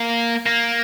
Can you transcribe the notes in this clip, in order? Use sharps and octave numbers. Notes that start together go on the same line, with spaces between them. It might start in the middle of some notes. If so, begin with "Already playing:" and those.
Already playing: A#3
A#3